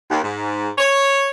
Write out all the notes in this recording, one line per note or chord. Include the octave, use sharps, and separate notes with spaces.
D#2
G#2
C#5